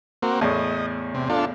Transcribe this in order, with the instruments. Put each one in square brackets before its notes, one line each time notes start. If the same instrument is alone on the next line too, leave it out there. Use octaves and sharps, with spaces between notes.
[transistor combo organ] A#3 C4 F#4
[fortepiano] E2 A2 A3 [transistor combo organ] D#5
[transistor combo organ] C3
D4 F4 A4